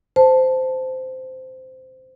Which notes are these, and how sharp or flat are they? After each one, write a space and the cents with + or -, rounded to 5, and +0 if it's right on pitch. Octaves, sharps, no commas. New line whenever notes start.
C5 -15 A5 +0